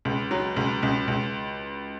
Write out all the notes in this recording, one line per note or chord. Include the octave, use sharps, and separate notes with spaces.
C#2
F#3
C#2
C#2
C#2